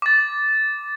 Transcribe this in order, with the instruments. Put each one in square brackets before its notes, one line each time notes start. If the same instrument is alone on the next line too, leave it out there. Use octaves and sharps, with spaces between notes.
[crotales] D6 A6